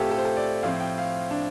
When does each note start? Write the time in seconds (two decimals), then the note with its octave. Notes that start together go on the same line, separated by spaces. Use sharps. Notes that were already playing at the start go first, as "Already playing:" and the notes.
Already playing: A2 A3 C4 F4 G4 A4
0.11 A4
0.18 C5
0.25 A4
0.37 D5
0.63 A2 F3 C4 F5
0.80 G5
0.98 F5
1.31 D4